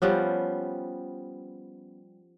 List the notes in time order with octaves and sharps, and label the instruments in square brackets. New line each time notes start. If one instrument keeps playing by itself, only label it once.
[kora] F3 G3 B3 C#4